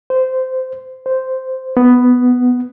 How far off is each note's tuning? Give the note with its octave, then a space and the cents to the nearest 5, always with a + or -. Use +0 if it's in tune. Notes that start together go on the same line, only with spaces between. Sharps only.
C5 -15
C5 -5
B3 +5